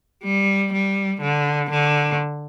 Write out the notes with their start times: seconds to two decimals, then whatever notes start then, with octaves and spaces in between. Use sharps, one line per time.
0.24 G3
0.73 G3
1.22 D3
1.70 D3